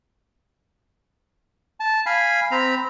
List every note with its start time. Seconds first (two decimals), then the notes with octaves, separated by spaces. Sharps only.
1.80 A5
2.06 F5 G#5 B5
2.51 C4 A#5 B5